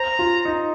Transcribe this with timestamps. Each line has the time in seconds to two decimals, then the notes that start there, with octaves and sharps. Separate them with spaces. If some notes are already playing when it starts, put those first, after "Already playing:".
Already playing: C5 A#5
0.19 F4
0.45 D#4